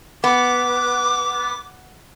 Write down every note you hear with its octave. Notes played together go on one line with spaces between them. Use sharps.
B3 D6